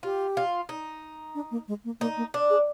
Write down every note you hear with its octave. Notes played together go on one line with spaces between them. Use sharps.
F4 G4
F4
D#4
D4
A#3
G#3
A#3
A#3 D#4
A#3
D4
G#4